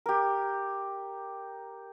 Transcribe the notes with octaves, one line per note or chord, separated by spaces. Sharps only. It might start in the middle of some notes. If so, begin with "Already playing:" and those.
G4 A#4